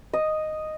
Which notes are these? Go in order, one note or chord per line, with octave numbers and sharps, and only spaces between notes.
D#5